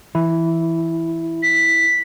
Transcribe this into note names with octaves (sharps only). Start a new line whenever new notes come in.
E3 E4
B6